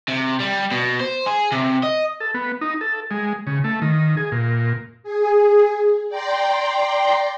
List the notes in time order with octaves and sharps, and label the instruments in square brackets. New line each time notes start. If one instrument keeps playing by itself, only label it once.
[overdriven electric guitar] C3
G3
B2
C5
G#4
C3
D#5
[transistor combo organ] A4
B3
D#4
A4
G#3
C#3
A3
D#3
G#4
A#2
[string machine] G#4
D5 G5 A#5 C6